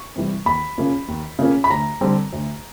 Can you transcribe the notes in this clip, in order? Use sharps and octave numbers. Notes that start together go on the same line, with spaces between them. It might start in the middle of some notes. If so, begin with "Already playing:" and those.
Already playing: C#6
C3 E3 G3
D#2 B5
C#3 F3 A#3 C#4
D#2
C#3 F3 A#3 C#4
B5
D2 A#5
D3 G3 C4
D2